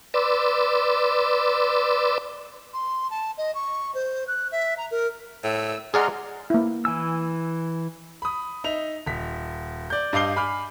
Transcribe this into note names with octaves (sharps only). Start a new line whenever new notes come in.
B4 D5 C6 D6 E6
C6
A5
D#5
C#6
C5
F#6
E5
A#5
A#4
A2 E6
G#3 G#4 D5 F#5 A#5 C6 F6
A#3 E4
E3 G#5 E6
B5 D#6
D#4 E5 F7
D#1 B6
D5 G6
G2 D#5 F5 D6 C7 G7
G#5 B5 D6 F6